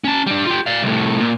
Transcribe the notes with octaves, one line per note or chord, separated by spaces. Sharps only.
C#4 A5
G3 D4
F4 G4
D5 F5
C2 A2
A#2